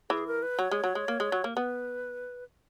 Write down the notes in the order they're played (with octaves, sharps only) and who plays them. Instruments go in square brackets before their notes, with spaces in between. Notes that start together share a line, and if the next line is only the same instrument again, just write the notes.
[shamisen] E3 [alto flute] G#4
[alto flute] A#4
B4
[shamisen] F#3 [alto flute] C#5
[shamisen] G#3
F#3
G#3
A#3
G#3
F#3
A#3
[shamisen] B3 [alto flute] B4